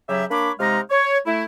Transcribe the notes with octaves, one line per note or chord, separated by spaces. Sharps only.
C#3 F#3 G4 E5
A#3 D4 C#5 B5 D6
C3 G#3 D#4 F5 A#5
C#5
A3 E4